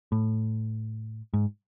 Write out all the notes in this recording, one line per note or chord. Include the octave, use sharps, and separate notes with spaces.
A2
G#2